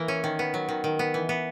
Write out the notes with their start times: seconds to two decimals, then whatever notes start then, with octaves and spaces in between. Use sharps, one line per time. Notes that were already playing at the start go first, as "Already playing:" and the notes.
Already playing: E3 A#3 A#4
0.08 C#4
0.24 D#3
0.39 B3
0.54 F#3
0.69 D#3
0.84 D#3
0.99 B3
1.14 E3
1.29 B3